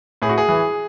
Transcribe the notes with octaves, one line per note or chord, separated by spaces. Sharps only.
A2 G#4
F#4
G#4
E3